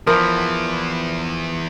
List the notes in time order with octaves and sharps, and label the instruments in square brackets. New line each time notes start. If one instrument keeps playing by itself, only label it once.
[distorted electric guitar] E2 E3 [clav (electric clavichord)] F3 [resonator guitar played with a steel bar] A#4